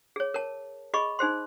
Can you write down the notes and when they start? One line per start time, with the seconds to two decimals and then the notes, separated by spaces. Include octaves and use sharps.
0.16 G#4 C#5
0.34 A#4 C#5 A5
0.94 G#4 D#5 B5 C#6
1.19 D#4 G#4 C5 C6